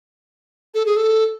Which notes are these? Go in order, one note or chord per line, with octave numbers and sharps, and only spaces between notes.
A4
G#4
A4